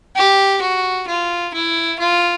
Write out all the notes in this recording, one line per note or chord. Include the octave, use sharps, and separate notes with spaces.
G4
F#4
F4
E4
F4